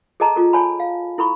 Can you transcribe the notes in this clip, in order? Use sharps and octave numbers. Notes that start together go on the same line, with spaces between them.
G#4 A4 D#5 A5 A#5
F4 A4
C#5 G#5 A5 B5
F5
E4 A4 B5 C#6